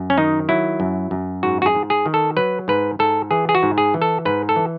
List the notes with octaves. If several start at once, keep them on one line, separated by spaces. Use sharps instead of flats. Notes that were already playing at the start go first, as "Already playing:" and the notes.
Already playing: F#2
C#4
D#3 D#4
F#3 E4
F#2
F#2
G#2 F#4
F#4
G#4
G#2
G#4
D#3
A4
F#3 B4
G#2 B4
G#2 A4
E3 G#4
G#4
F#4
G#2
G#4
E3
A4
G#2 B4
A4
E3